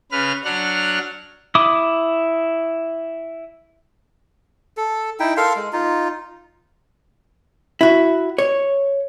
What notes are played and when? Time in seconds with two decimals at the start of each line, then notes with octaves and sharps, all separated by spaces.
0.11 C#3 B4 F6
0.45 F#3 D4 F#5 F6
1.55 E4 D6 D#6
4.77 A4
5.20 D#4 E4 G5
5.37 A4 A#4 F5 C6
5.56 G#3
5.73 D#4 F4
7.81 E4 F#4
8.38 C#5